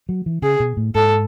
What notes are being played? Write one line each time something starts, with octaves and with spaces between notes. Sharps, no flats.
F#3
E3
C#3 G#4
B2
A2
G#2 A4